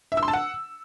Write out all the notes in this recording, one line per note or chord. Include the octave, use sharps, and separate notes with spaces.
E5
E6
C6
A5
F#5